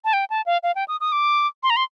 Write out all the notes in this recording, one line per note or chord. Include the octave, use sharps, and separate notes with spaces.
A5
G5
A5
F5
F5
G5
D#6
D#6
D6
C6
A#5
C6